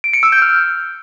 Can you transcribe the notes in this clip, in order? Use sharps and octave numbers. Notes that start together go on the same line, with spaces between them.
D7
C#7
E6
G6
F6